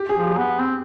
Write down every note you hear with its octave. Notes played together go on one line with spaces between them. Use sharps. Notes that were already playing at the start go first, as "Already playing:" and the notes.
Already playing: G4
G#4
F3
G4
B3
C4